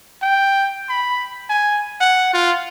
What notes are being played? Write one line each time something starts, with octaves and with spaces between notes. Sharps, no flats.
G5
B5
G#5
F#5
F4